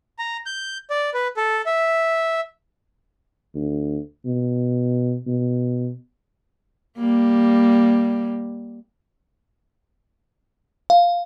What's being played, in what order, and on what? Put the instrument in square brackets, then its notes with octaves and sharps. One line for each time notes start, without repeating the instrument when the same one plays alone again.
[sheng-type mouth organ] A#5
G6
D5
B4
A4
E5
[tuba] D2
B2
B2
[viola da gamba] G3 A#3
[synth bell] F5